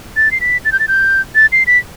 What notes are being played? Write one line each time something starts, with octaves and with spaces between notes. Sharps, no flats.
A6
C7
B6
A6
G6
A6
G6
A6
C7
B6